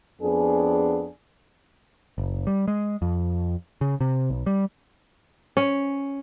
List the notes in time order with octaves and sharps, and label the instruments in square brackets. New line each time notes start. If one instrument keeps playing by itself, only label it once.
[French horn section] F2 B3 D4 G#4
[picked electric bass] F#1
G3
G#3
F2
C#3
C3
B1
G3
[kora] C#4